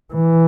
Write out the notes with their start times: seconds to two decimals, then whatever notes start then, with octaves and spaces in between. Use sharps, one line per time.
0.14 E3